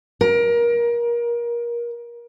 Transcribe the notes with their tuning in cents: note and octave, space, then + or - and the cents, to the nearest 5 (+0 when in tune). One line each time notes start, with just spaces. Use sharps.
A#4 +25